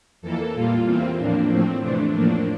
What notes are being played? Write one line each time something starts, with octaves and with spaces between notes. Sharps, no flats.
F2 E3 A#3 A4
A#2 G3 A#3 F4
E2 E3 A#3 C4
A2 F3 A#3 D4
A2 F3 A3 C4
F2 C3 E3 A3 D4
A2 F3 A#3 D4